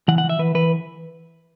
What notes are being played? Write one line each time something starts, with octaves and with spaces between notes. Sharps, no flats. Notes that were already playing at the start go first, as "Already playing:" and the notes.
E3 F#5
F#5
E3
E5
E3 B4
E3 B4